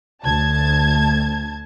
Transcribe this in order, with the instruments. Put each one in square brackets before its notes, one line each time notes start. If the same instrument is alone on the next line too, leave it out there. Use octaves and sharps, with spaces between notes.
[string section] D2 A5 G#6